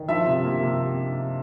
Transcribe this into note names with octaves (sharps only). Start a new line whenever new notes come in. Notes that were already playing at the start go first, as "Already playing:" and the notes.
Already playing: D#3
F3 E5
C3
A#3
C3